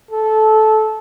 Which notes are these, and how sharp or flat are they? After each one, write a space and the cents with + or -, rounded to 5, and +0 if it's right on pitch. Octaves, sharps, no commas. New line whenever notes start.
A4 -15